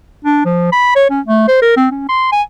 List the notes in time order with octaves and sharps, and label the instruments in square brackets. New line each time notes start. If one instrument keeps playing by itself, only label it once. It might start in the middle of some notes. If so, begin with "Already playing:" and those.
[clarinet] D4
F3
B5
C#5
C#4
A3
C5
A#4
C4
C#4
C6
G#5